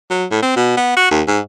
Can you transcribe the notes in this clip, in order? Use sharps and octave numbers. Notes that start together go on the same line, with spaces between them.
F#3
A2
C4
B2
B3
F#4
D#2
G#2